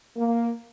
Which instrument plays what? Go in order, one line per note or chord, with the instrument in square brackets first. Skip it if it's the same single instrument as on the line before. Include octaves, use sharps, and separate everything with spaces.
[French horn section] A#3